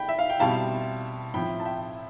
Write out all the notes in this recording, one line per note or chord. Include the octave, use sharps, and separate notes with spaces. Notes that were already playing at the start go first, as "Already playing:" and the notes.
Already playing: A3 D4 G5 B5
E5
F5
G5
B2 G3 C4 E4 F5 A5
A2 F3 C4 E4 G5 B5
A5
E5 G5